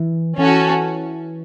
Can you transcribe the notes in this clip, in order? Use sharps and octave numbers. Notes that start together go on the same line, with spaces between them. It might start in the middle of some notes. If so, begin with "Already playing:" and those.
Already playing: E3
E3 C#4 F#4 A4